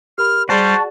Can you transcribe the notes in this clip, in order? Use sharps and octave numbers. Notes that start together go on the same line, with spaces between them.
G4 A#4 B5 F6
G3 F#4 G#4 C5 D5 A5